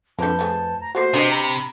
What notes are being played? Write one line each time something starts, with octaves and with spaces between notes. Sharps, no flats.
F2 D3 A#3 B4 A5 G6
F3 A3 G#4
A#5
F3 A3 A#3 F#4 C5
C3 D4 B4 D#5
A#5 B5